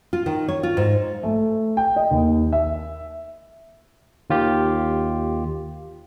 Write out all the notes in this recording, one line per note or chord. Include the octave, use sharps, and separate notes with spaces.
F4
D#3
C#5
F4
G#2
A3
G5
D#5
D#2
E5
D#2 F4 G4